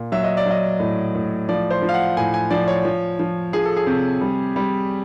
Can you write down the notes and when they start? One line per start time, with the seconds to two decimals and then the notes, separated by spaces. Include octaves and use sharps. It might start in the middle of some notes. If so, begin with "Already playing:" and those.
Already playing: A#2
0.12 F#3 E5
0.24 D#5
0.37 D5
0.46 F#3 D#5
0.80 A2
1.15 A2
1.49 F3 D5
1.71 C5
1.82 F3
1.89 F5
1.94 F#5
2.17 A2 G#5
2.34 G#5
2.51 F3 D5
2.68 C#5
2.85 F3
3.19 F3
3.53 F3 G#4
3.65 A4
3.77 G#4
3.87 C3
4.21 G3
4.56 G3